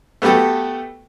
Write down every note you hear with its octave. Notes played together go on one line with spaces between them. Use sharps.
A3 B3 F#4 G4 A4